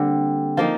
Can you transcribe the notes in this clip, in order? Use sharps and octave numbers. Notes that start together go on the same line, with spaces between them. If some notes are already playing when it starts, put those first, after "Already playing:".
Already playing: D3 G3 A#3 C4
F3 A#3 D#4 F4